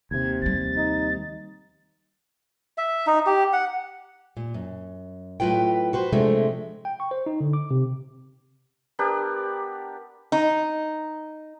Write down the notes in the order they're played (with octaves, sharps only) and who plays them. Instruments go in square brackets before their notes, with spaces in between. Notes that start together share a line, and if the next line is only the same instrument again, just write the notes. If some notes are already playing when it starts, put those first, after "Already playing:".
[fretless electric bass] D#2 C3 [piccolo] G#6
[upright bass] F3 G3 [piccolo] A6
[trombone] D#4
[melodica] E5
D#4
G4
F#5
[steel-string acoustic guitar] A#2
F#2
A2 F#3 F4 B4 G5
F#4 B4 C5
C3 F3 G#3 A3 C4 D4
[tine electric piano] G5
C#6
C5
D#4
D3
D6
C3
[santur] B3 D4 G4 A#4
[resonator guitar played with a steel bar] D#4